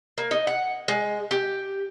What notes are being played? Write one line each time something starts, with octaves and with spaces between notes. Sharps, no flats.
A#3
D#4
F#5
G#3
G4